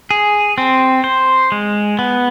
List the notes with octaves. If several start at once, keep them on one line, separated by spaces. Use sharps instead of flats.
G#4
C4
C5
G#3
B3